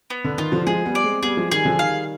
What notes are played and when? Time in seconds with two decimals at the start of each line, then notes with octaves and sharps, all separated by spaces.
0.10 B3
0.24 D3
0.38 D#3 F4
0.52 D3 F3
0.67 F3 G#3 G#4
0.85 G3 B3
0.95 D5
1.04 G#3 C4
1.23 G3 B3 G#4
1.37 F3 G#3
1.51 D#3 G3 G#4
1.65 D3 F3
1.79 D#3 G3 F5